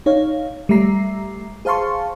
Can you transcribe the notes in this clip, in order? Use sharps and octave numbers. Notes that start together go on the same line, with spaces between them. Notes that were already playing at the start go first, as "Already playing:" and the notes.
D#4 C#5 F5
G3 A3 E5 A#5 C7
G#4 C5 F5 A5 C6 C#6